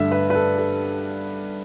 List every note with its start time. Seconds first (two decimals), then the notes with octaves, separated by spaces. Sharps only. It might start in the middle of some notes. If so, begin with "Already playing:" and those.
Already playing: G2 D3 A3 E5
0.11 B4
0.30 B4
0.35 A4
0.58 A4